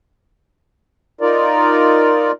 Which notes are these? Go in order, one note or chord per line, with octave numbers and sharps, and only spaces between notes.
D#4 F4 A#4 D5